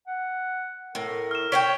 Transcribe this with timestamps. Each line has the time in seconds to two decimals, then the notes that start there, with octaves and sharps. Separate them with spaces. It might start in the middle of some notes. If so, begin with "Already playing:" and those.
0.07 F#5
0.95 A2 A#4
1.31 F6 E7
1.52 C#5 F5 G5 B6 D7 G7